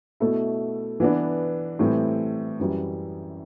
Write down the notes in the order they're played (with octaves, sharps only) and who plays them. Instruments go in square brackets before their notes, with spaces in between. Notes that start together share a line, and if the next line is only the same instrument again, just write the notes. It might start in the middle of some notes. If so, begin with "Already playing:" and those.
[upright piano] B2 A3 E4 A4
E3 B3 D4
A2 E3 G3 C4 E4
F#2 E3 G3